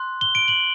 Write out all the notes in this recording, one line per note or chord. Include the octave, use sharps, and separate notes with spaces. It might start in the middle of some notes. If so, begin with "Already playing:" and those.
Already playing: C6 F#6
G7
D7
F#7